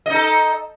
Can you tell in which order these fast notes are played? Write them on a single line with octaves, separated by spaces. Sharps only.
D#5 D#4 A4